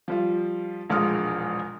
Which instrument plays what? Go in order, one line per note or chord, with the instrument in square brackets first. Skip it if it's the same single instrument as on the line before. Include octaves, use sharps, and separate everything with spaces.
[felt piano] F3 G3 F4
E1 A#1 G#3 F4 D#6 F6